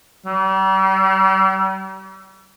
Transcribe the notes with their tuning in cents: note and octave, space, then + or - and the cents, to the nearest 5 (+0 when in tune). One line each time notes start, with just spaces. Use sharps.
G3 -40